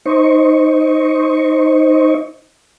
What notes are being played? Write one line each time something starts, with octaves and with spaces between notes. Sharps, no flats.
D#4 C5 D#5 C#6